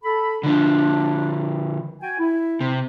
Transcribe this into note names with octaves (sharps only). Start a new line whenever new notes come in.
A4 B5
D3 F3 D4
F#4 G5 G#5
E4
C3